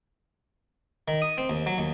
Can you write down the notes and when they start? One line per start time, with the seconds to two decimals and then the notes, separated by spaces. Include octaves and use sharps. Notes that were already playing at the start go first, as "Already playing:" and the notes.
1.08 D#3
1.22 D#6
1.38 C4
1.49 D#2
1.66 F#3
1.78 D#2